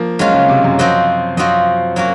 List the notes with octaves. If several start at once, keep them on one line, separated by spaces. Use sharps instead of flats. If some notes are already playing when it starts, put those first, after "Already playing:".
Already playing: F3 A#3
F#3 G#3 C#4 F4
C#3
C3
F#2
F3 C4 F#4 C5 D#5
F#2 F3 C4 F#4 C5 D#5
F#3 A#3 C#4 F#4